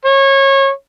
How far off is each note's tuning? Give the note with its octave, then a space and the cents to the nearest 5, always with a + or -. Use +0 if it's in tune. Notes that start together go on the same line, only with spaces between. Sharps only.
C#5 -25